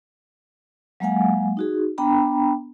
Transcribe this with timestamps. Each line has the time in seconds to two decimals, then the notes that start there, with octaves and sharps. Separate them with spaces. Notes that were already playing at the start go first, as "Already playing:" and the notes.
1.00 F#3 G#3 A#3 F5 F#5 G#5
1.57 D#4 F#4 G#4
1.98 B3 D4 G5 A#5 B5